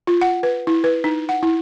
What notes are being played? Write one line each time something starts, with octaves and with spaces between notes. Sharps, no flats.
F4
F#5
B4
E4
B4
D#4
F#5
E4